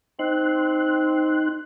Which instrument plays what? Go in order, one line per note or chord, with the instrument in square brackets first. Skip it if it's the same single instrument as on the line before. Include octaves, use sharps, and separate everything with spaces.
[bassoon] C4 [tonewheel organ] D#4 C6 F#6